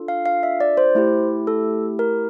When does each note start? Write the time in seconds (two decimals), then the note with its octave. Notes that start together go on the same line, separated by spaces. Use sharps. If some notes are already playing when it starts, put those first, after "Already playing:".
Already playing: D4 F4 A4
0.08 F5
0.26 F5
0.43 E5
0.60 D5
0.77 C5
0.95 A3 E4 G4
1.47 A4
1.99 A#4